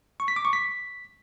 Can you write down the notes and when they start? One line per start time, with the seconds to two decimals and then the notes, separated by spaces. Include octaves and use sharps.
0.20 C#6
0.28 B6
0.36 D6
0.45 C#6
0.53 B6